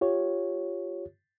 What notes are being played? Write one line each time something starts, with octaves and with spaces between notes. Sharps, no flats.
F4 G4 C#5